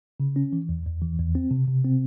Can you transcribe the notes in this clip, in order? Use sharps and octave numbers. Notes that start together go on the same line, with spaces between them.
C#3
C#4
E3
E2
E2
E3
E2
C4
C3
C3
C4